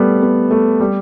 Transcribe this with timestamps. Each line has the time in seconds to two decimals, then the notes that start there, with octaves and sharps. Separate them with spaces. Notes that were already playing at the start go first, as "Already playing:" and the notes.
Already playing: G3 A3 B3
0.22 B3
0.51 A3
0.80 G3